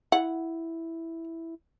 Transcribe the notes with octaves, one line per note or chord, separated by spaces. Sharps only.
E4 F#5